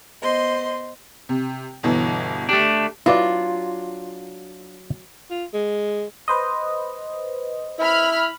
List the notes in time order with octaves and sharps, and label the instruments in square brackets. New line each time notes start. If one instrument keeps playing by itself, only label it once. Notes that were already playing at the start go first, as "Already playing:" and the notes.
[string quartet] B3 C5 D#5 C6
[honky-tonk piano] C3
G1 B2 E3
[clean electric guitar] A3 D4 [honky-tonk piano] G4
[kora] F#3 D4 [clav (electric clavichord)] E4 B4 D5 [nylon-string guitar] F4
[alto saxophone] F4
G#3
[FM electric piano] B4 C5 D#5
[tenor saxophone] E4 [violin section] B5 F6